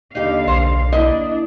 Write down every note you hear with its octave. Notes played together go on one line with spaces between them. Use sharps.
D#2 D3 D#4 G4 F5
B1 C5
A#3 D4 E4 D#5